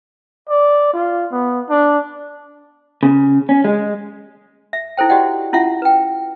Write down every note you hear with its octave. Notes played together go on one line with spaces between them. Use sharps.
D5
F4
B3
D4
C#3
C#4
G#3
E5
D#4 E4 A4 C5 G5
F#4 G4 D5 D#5 F#5 G5
C#4 E4 F4 E5 F#5
B4 G5